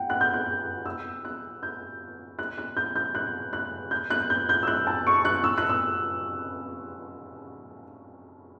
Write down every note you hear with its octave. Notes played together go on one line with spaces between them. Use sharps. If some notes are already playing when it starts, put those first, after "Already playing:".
Already playing: F#5 G5
F#6
G6
F#6
E6
F#6
G6
F#6
F#6
G6
G6
F#6
F#6
G6
F#6
G6
G6
E6
F#6
A5
C#6
F#6
E6
F#6
E6